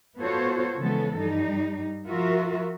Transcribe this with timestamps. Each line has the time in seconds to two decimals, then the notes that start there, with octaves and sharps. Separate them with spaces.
0.19 B3 F4 F#4 A4 C5 C#5
0.76 C#3 E3 F3 G#3 B3 A4
1.19 G2 G3 D#4
2.08 F3 F4 F#4 A#4 E5